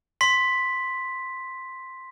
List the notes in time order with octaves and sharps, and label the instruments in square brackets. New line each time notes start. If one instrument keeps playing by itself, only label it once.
[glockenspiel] C6 B6